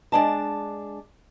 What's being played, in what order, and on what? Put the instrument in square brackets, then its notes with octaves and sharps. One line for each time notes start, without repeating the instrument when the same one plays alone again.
[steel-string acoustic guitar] G#3 D4 A5